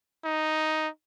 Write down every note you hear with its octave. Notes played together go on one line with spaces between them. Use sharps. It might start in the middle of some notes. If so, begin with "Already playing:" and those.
D#4